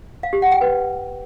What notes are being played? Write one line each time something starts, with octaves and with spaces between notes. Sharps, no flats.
F5
G4
F#5
G5
B4